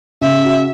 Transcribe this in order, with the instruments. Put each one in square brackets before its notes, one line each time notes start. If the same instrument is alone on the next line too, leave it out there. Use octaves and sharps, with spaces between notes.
[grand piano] C#3 [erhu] E5
[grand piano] F#4